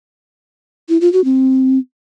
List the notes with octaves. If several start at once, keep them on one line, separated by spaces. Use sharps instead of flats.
E4
F4
F#4
C4